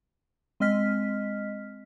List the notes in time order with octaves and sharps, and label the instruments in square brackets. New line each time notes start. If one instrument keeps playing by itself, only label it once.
[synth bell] G#3 C4 D#5 F6 B6